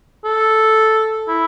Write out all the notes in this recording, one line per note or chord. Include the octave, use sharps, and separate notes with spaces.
A4
E4